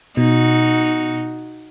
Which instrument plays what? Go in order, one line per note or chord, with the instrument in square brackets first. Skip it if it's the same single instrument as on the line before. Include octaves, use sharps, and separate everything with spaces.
[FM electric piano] B2 [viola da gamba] D#4 F#4